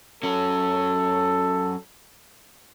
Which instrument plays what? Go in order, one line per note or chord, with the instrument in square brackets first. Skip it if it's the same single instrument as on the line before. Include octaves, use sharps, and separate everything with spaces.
[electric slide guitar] F#3 C#4 C#5 [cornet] A4